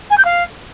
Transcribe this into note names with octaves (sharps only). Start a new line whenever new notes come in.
G#5
G6
F5